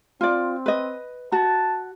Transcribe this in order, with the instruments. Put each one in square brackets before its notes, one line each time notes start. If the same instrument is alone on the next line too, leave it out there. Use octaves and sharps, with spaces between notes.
[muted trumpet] C4 [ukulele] F4 D5
[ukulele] B4 D#5
[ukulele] F#4 [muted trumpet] A5